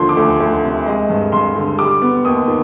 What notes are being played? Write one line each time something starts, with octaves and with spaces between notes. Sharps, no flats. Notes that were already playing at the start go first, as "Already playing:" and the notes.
Already playing: D#2 D3 F3 C6
D6
D2
D2
C3
G#3
G2
G2 C6
D3
G3 D6
B3
D#2 D#6
D#3